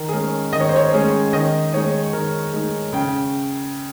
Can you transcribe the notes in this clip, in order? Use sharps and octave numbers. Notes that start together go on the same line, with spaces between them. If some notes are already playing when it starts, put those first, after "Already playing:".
Already playing: D#3 A#4
G#4
G#3 C#4 A#4
D#3 D#5
C#5
C5
C#5
G#3 C#4
D#3 D#5
G#3 D#4 C#5
D#3 A#4
G#3 D#4
C#3 G5